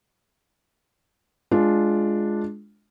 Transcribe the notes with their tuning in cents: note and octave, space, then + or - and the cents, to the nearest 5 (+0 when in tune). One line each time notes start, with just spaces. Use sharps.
G#3 +15 D4 +0 F4 +0